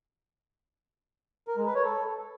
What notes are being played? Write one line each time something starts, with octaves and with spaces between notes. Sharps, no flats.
A#4
G#3
B4
C#5
A4